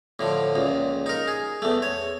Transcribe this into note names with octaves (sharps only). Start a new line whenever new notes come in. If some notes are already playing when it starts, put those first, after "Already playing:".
A2 D3 F3
C#2 A#2
D#4 A#4
G#4
E2 A3
C#5